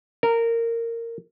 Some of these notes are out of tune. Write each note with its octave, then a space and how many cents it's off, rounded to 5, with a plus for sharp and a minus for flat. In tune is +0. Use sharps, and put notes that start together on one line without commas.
A#4 -15